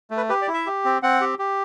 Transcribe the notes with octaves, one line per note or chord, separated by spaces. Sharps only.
A3
B4
G4 B4
D5
E4
E5
G4
C4
C4 F#5
G4
G4